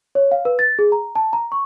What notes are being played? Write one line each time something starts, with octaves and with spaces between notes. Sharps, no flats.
C#5
F5
B4
A6
G#4
A#5
A5
A#5
C#6